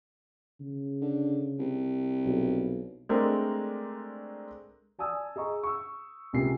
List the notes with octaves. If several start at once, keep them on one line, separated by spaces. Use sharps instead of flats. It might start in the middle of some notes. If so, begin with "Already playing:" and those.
C#3
D3
C2
B1
G#3 A3 C4 D4 A#4
D5 G#5 A5 D#6 E6
G#4 D#5 A#5 C#6
C#6 E6
C#2 C3 A#3 F4 G#5 C7